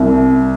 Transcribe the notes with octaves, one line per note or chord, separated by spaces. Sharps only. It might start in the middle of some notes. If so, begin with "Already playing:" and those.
Already playing: C2